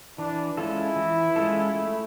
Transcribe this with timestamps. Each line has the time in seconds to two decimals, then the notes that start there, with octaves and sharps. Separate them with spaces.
0.18 E3 D4
0.57 G#3 C#4 E4 F4 A4
0.96 E3
1.36 G#3 C#4 F4 A4
1.75 A3